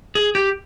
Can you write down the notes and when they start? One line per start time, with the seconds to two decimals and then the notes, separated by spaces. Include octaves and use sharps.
0.15 G#4
0.35 G4